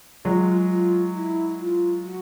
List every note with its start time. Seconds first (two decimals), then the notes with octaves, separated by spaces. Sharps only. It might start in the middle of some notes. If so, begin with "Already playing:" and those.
0.25 F#3 G#3 F4
0.70 F4
1.15 E4
1.60 F4
2.04 F#4